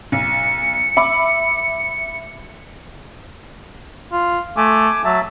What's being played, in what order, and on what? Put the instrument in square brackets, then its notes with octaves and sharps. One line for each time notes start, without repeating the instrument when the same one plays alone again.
[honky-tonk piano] B1 [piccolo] C#7
[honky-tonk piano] E5 B5 D6
[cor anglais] F4
[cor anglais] A3 [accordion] G#5 D6
[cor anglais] F#3 [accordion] E5 A5